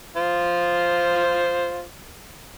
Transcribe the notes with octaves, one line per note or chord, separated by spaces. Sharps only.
F4 C5